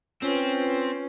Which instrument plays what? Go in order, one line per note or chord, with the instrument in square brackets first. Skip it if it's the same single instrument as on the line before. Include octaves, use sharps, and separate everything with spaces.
[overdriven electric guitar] C4 [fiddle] C#4 [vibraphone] F4 B4